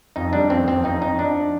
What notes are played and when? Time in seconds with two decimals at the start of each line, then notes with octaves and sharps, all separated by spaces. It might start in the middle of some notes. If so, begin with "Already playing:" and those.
0.16 F2 D#4
0.33 G3 D4
0.50 F2 C4
0.67 F2 C4
0.84 F2 D#4
1.02 F2 D#4
1.19 F3 D4